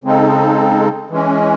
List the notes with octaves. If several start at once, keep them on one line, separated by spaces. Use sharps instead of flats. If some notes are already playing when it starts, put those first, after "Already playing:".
C#3 G#3 C4 D#4 A4
E3 G#3 C#4